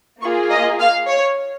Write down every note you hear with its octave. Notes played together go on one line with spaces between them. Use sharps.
A#3 F4 G#4 C#6
D#5
F5
C#5